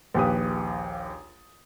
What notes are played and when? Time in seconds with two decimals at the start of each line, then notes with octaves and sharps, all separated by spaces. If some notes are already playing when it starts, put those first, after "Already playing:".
0.15 A#1 D#2 G4 B4 D#6